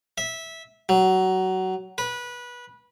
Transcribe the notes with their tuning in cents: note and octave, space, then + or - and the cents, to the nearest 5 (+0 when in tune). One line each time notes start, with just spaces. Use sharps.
E5 -15
F#3 +20
B4 -20